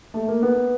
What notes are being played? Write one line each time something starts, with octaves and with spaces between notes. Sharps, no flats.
A3
A#3
B3